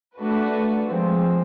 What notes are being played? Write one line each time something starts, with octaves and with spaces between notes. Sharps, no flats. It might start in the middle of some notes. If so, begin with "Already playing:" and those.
A3 D4 F#4 B4
F3 G#3 C4